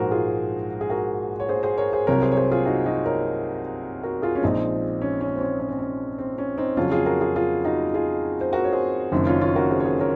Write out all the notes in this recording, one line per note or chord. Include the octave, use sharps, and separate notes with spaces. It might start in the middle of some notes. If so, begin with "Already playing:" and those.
Already playing: A#1 G#2 F3 G#3 F#4 G#4 A#4 C5
F4 G#4
G#4
F#4 A#4
C#5
G#4 C5
G#4 C5
A#4 C#5
G#4 C5
C2 C3 F#3 A#4 C#5
G#4 C5
C#5
G#4 C5
F4 G#4
D#4 F#4
D#4 F#4
A#4 C#5
F#4 A#4
F4 G#4
C#4
A#1 A#2 F3 G#3 C4 D#4
C#4
C#4
C4
C#4
C#4
C4
C#4
C4
C#4
C4 D#4
F2 C#3 F#3 C#4 F4
F4 G#4
F#4 A#4
F4 G#4
F4 G#4
D#4 F#4
F4 G#4
C5
F#4 A#4
C#5
G#4 C5
F#1 F#2 D#3 C4 D#4
C#4 F4
C#4 F4
F#4 A#4
G#4 C5
C#5
G#4 C5
A#4 C#5